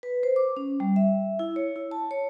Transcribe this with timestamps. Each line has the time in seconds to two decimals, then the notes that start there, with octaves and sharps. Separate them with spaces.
0.03 B4
0.23 C5
0.36 D6
0.57 C#4
0.80 G3
0.96 E5
1.39 E4
1.56 C#5
1.76 E4
1.91 A5
2.11 C#5